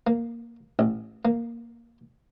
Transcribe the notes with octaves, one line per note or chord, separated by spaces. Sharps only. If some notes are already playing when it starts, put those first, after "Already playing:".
A#3
A1
A#3